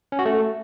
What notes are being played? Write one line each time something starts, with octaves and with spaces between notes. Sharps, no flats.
C#4
F#4
A3